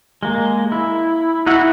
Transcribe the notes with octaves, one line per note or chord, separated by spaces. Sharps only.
G#3 A#3
E4
D#4 E4 F#4 F#5